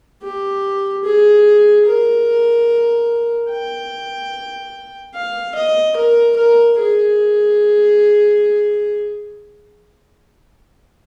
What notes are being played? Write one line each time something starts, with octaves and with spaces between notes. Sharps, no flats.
G4
G#4
A#4
G5
F5
D#5
A#4
A#4
G#4